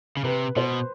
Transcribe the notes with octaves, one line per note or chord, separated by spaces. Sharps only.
C#3
C3 B4
B2 C5